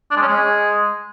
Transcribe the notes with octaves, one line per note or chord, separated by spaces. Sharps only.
D4
G#3
C#4
G#3